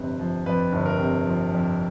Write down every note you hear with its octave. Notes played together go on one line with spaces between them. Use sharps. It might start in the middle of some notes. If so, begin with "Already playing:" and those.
Already playing: G1 F2 C3 B4
F3
F2 B4
G1
A#4
C3
F3
F2